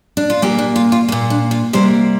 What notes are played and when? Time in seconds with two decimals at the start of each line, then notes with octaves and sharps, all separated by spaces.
0.17 D4
0.30 F4
0.42 A#2 A#3 G4
0.58 D4
0.76 F4
0.92 F4
1.08 A#2 A#3
1.30 D4
1.51 F4
1.73 C3 G3 A#3 C5